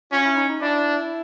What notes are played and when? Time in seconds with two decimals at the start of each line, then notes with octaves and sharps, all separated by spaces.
0.11 C#4 F4
0.24 E4
0.36 D#4
0.49 D#4
0.61 D4 E4